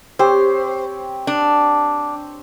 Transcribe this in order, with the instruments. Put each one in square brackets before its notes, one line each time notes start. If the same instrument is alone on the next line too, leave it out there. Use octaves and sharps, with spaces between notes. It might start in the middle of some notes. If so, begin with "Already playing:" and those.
[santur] C4 G4 C#5 [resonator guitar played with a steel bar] C5
[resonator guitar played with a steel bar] D4